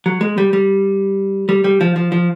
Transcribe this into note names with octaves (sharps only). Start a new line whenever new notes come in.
F#3
G#3
G3
G3
G3
G3
F3
F3
F3